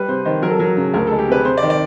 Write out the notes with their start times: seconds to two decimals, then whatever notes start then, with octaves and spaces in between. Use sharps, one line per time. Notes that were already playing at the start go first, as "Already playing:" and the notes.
Already playing: G3 B4
0.08 C3 C5
0.25 D#3 C5
0.42 F#3 A#4
0.50 A4
0.59 F#3 A#4
0.77 C#3
0.94 D2 A#4
1.07 A4
1.11 G#3
1.19 G4
1.28 C3 B4
1.45 C3 C5
1.57 D5
1.62 D#3
1.70 D5